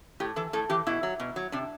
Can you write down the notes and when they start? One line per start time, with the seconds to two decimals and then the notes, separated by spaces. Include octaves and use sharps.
0.20 A2 G4
0.36 E3 A4
0.53 A2 A4
0.70 E3 G4
0.87 B2 E4
1.03 F#3
1.20 B2
1.36 F#3
1.52 C3 D4